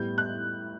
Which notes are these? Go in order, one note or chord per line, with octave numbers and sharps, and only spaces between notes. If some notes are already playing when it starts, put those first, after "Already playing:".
Already playing: A2 G3 B3 G6
F#6